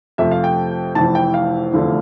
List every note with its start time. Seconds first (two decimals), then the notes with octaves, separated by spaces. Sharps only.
0.18 F2 C3 F3 A3 E5
0.31 F5
0.44 G5
0.95 F1 F2 E3 A5
1.15 G5
1.34 F5
1.74 F1 E2 D3 F3 A3